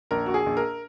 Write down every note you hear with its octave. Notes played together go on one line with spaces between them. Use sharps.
A#1 A#4
A#1 F#4
G#4
A#1
A#4